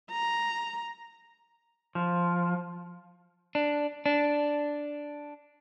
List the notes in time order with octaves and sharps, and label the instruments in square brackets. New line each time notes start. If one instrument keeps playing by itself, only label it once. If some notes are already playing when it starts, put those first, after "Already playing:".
[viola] A#5
[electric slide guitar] F3
D4
D4